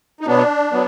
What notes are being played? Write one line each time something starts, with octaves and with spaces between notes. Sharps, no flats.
D#4
B2 F#3 B3 D4
F#3 B3